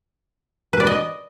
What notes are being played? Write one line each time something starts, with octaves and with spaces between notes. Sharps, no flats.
B4
D5
D#5